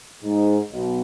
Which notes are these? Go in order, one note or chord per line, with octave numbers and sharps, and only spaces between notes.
G#2
B1 B2